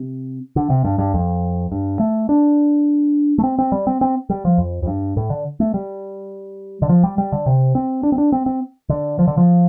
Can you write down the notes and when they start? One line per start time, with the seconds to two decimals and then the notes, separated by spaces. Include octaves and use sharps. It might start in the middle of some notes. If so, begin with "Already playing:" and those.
Already playing: C3
0.56 D3
0.70 C3
0.84 G2
0.99 G2
1.14 F2
1.72 G2
2.00 A3
2.29 D4
3.38 A3
3.44 C4
3.59 C4
3.72 G3
3.87 C4
4.01 C4
4.30 G3
4.45 F3
4.58 F2
4.83 F2
4.87 G2
5.17 A2
5.30 D3
5.60 A3
5.74 G3
6.82 D3
6.89 F3
7.04 G3
7.18 G3
7.32 D3
7.46 C3
7.75 C4
8.03 D4
8.12 C4
8.18 D4
8.32 C4
8.46 C4
8.89 D3
9.19 F3
9.27 D3
9.37 F3